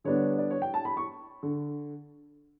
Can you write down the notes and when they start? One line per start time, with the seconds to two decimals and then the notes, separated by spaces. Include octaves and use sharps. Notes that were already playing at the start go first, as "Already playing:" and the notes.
0.04 D3 G3 B3 D4 C#5
0.39 D5
0.51 C#5
0.62 G5
0.74 A5
0.85 B5
0.97 C#6
1.43 D3